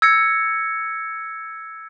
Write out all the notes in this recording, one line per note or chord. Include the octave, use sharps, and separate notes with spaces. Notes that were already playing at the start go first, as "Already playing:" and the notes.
E6 G#6 A#6 C#7